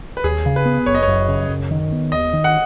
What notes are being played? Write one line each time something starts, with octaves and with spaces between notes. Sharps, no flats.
B4
D#2 G#4
C#3
B4
B3
F#1 C#5
D#5
C#5
F#2
C#3
F#2
D#3
B3
D#2 D#5
D#3
F#5